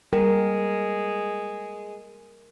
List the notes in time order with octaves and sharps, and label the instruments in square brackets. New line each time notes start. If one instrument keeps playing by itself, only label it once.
[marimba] G3 [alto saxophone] G#3 [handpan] A#4